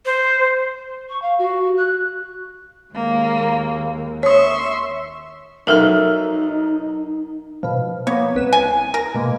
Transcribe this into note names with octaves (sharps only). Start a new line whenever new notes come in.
C5
C#6
F5
F#4
F#6
D#2 G#3 A#3
C#5 E5 C6 C#6 D#6
B1 D#4 A4 A#4 E5 F6
B2 F3
A#3 B3 C#5
C2 B4 E7
G#5
A#4 A#6
B2 G#3 A#3